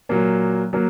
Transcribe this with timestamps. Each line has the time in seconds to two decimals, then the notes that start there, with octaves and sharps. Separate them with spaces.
0.09 A#2 F#3 A#3
0.73 F#3 A#3